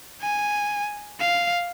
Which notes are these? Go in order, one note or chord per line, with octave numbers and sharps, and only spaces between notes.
G#5
F5